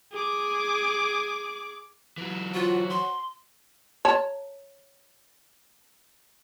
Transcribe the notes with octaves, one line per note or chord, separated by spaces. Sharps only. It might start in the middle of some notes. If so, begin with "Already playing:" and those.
G#4 D6
E3 F#3
F4 F#4 C5 C#5 F#5
C6
C#5 A5